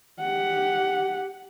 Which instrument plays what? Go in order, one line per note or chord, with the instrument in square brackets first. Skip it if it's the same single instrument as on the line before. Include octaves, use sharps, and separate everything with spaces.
[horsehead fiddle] G4 F#5